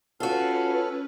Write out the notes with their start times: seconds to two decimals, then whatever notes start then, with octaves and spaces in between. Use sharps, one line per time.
0.20 C#4 F4 F#4 A4 B4 F6